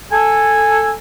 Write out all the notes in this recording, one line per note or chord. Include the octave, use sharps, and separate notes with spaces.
A4 G#5